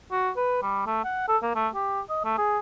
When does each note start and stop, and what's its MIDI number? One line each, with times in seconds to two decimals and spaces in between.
0.12 0.30 66
0.36 0.59 71
0.62 0.85 55
0.86 1.02 57
1.04 1.25 78
1.28 1.37 69
1.43 1.53 58
1.55 1.68 57
1.75 2.01 67
2.10 2.22 75
2.25 2.36 57
2.38 2.59 68